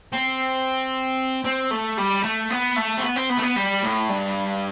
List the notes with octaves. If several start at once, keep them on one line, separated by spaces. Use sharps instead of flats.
C4
C4
A3
G3
A3
B3
A3
C4
B3
C4
B3
A3
B3
G3
A2
G2